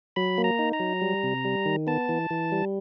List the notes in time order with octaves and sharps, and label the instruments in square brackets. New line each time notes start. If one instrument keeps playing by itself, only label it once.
[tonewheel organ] F#3 B5
A#3
A#5
D#4
A#5
F#3
G3
C3
G3
D#3
B3 A5
E3
E3
G3